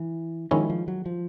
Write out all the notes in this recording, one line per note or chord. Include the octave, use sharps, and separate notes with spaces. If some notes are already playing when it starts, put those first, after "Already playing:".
Already playing: E3
D#3 F3 G#3 C#4 E4
F3
F#3
F3